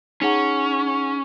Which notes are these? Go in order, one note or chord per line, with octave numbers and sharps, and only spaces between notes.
C#4 D#4 G#4 F#5 A#5